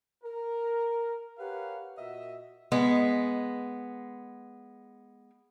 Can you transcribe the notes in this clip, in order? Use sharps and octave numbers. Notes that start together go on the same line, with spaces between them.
A#4
G4 A#4 B4 C#5 F5 F#5
A#2 F#4 D#5 E5
G#3 B3